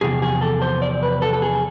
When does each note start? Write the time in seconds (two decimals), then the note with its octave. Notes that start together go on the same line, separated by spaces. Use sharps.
0.01 E2 C3 F3 G#4
0.22 G#4
0.41 A4
0.62 C5
0.82 D5
1.03 B4
1.22 A4
1.33 A4
1.42 G#4